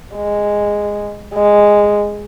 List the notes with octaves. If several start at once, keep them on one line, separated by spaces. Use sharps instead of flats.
G#3
G#3